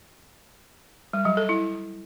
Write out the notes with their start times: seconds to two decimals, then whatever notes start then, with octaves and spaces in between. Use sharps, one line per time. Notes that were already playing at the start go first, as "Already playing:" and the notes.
1.13 G3
1.25 F#3
1.37 A4
1.49 E4